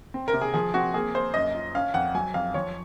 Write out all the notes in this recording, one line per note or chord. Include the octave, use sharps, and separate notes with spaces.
C4
A#4
C3
G#4
F3 G#4
C4 F#4
A#3 G#4
A#3 C5
F#2 D#5
F4
C#4 F5
F2 F#5
F#3 G#5
F2 F5
F3 C#5